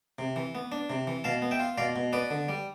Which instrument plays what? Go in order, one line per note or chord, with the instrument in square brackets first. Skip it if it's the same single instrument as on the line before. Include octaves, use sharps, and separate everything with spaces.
[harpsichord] C3
E3
B3
D4
C3
E3
B2 F5 A5
B3
E5 G5
F4
B2 D5 F5
B2
B3 B4 D5
D3
G3